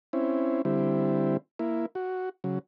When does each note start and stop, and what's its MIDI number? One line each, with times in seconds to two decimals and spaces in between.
0.13 0.62 60
0.13 0.62 61
0.13 0.62 64
0.65 1.37 50
0.65 1.37 55
0.65 1.37 60
0.65 1.37 64
1.59 1.86 58
1.59 1.86 64
1.95 2.29 66
2.44 2.59 49
2.44 2.59 54